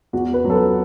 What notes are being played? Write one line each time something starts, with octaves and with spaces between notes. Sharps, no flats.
E2 F#4
B4
F#3
A4
B4